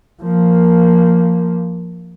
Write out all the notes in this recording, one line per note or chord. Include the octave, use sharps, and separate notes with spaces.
F3 A#3